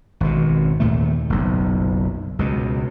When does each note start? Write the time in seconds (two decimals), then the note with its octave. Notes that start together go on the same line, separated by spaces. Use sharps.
0.20 G#1 B2
0.80 D#2 A#2 A3
1.30 F#1 B1
2.39 C#2 B2